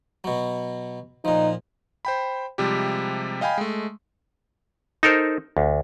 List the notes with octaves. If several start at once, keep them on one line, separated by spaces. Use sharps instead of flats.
B2 F#3
A#2 F3 D#4
C5 G5 B5
C3 F3 G3 G#3 G4
D#5 F5 G5 G#5 B5
G#3 A3
D#4 A4 A#4 C5
D2